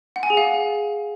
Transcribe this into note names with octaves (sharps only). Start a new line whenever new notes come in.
F#5
G#5
G#4
F5